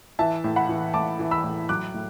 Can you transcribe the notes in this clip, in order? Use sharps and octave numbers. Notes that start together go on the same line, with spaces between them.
E3 E5 A5
A2
F#5 B5
E3
A2 A5 D6
E3
B5 E6
A2
F#3 D6 F#6
A2